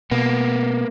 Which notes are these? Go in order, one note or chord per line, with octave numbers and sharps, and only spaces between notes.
B2 A#3 B3